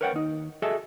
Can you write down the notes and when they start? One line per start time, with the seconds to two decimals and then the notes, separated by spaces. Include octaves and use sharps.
0.01 A#4 B4 C#5 E5 F#5 G5
0.13 D#2 D#4
0.62 F#4 G#4 A4 D#5 E5